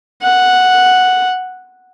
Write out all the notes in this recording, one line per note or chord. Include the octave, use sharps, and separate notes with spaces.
F#5